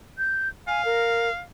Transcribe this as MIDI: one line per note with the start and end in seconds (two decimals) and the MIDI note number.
0.18 0.49 91
0.67 1.42 77
0.67 0.82 80
0.85 1.29 70